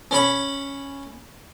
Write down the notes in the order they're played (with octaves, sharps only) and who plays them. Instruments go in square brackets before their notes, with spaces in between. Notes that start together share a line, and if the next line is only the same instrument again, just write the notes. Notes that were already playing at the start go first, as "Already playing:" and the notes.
[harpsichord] C#4 C#5 B5